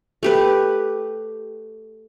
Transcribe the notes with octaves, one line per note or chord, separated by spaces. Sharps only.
A3 G4 B4